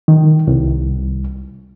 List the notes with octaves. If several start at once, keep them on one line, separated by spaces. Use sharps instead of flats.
D#3
C2